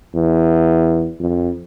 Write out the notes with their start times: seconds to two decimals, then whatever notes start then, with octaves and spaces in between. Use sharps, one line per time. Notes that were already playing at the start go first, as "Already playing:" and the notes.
0.15 E2
1.19 F2